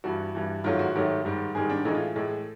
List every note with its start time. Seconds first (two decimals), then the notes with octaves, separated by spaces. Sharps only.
0.04 G2 E3 G3 F#4
0.35 G2 E3 G3
0.64 G#2 D#3 F#3 A3 F4
0.79 F#4
0.95 G#2 D#3 F#3 A3 G4
1.25 G#2 D#3 G3
1.55 G#2 D#3 G3 G#4
1.69 D4
1.85 A2 E3 G#3 D#4
1.95 F4
2.15 A2 E3 G#3 A4